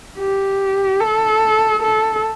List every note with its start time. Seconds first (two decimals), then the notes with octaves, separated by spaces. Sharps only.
0.18 G4
1.00 A4
1.83 A4